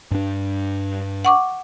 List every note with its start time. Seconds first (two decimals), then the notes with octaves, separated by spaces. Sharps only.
0.11 G2 D4
1.25 F#5 C#6 D6